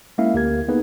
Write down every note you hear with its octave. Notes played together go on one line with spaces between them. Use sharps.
G#3 A#3 C#4 E4 E5 F5
D2 A#3 G4 A#4 G#6
A#3 B3 D#4 G#4 B4